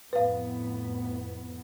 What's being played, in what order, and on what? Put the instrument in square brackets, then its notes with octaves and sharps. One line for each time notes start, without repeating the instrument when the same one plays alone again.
[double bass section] F2 A2 B3 [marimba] B4 F5